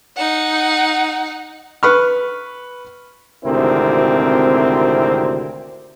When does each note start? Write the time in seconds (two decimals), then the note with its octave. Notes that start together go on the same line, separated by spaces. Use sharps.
0.17 D#4 F#5
1.83 B4 C#6 F6
3.44 G#1 D2 C3 C4 E4 A#4